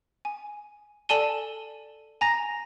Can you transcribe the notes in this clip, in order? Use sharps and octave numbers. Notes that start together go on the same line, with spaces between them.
G#5
A4 D5 G#5 A5 D#7 G7
G#5 A#5 A#6